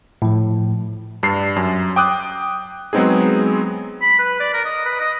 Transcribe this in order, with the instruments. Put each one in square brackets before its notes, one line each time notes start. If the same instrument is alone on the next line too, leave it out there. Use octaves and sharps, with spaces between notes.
[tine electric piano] A2 F3
[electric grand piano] G2 D4 C7
F#2
G5 D6 D#6 F#6
F#3 G#3 B3 C4 D#4 G#4
[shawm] B5
B4
D5
A#4
D#5
B4
D#5